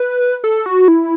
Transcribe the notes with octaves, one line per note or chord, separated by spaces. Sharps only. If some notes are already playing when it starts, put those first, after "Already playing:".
Already playing: B4
A4
F#4
E4